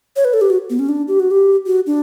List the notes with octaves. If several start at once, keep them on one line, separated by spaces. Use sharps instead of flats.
C#5
B4
A4
G4
F#4
B3
C#4
D4
G4
F#4
G4
F#4
D4